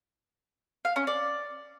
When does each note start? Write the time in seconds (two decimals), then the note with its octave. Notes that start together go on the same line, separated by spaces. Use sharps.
0.85 F5
0.96 C#4
1.07 D5